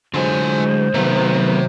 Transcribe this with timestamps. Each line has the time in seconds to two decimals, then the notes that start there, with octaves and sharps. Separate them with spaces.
0.14 D3 F#3 G#3 F4 C5 G#5
0.94 C3 D#3 F#3 A3 B3